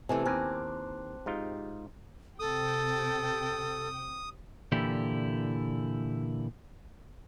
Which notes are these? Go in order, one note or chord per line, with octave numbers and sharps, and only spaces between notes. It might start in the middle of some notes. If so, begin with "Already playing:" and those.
C3 E3 A3 G#5 A5
D#2 C4 A#4 G#5 A5 D6 F#6
G#2 D#4 F4 G4
C3 A4 G5 D#6
A#2 D3 E3 E4 G4